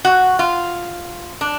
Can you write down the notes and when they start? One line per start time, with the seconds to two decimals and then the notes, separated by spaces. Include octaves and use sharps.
0.05 F#4
0.39 F4
1.41 D4